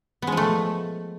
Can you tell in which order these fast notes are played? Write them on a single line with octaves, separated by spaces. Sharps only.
B3 G#3 F3 A3